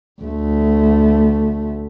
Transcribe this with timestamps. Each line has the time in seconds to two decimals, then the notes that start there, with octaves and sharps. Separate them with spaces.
0.22 D2 A3